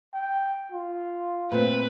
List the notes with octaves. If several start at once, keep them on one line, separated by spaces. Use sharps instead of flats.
G5
F4
A#2 A3 C4 B4